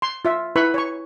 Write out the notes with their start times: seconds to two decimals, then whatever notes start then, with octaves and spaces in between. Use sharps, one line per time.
0.02 C6
0.25 F4 E5
0.56 E4 B4 B5 C#6
0.74 C#5 C#6